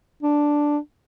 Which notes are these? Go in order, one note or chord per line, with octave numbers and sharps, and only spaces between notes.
D4